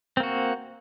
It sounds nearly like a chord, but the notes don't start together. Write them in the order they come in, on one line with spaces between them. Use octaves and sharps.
C4 A#3 F#4